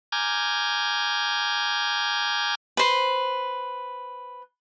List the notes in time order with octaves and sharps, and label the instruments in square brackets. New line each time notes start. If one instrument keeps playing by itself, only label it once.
[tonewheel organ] G#5 A#5 D6 F6 G6 G#6
[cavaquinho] B4 C5